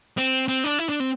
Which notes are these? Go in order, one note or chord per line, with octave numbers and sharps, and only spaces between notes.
C4
C4
D4
E4
D4
C4